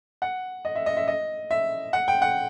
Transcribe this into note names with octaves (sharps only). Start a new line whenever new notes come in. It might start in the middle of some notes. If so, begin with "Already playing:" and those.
F#5
D#5
E5
D#5
E5
D#5
E5
F#5
G5
F#5